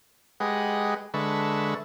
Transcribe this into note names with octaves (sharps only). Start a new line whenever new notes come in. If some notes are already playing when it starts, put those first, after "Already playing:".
G#3 G4 G#4 B4 D#5 F#5
D3 G#3 B4 E5 A5 C#6